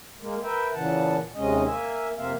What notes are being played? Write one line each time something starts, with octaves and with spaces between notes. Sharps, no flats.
G#3 A#3
A#4 B4 E5 G5
A#2 C#3 E3 F#5 A5
D#2 C3 G#3 C#4 D#5
A#3 E5 G#5
F2 C3 A#3 C4 E5 F5